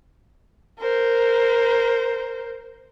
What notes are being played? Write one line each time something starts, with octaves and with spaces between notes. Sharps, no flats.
A#4 C5